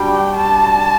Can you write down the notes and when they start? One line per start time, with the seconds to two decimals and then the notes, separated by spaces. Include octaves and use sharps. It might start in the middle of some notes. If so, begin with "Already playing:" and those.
Already playing: G3 D4 F#4 G5
0.35 A5